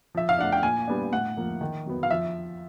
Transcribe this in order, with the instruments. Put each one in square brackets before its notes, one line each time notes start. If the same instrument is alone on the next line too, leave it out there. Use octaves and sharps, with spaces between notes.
[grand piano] F3 E5
F5
A3 D4 F#5
G5
A#2 G#5
G3 B3 D4
A2 F#5
F3 A#3
D#3
F#3 B3
F5
F3 E5